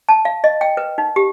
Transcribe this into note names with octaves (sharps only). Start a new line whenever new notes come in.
A5
F5
D#5
G5
B4
D#4
G4